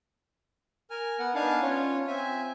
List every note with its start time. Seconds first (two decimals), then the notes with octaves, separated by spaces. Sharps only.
0.90 A#4 G#5 F6
1.19 B3 F#5
1.35 B3 D4 D#4 F5 G#5 A5
1.62 C#4 F4 C#5
2.07 C4 E5 G#5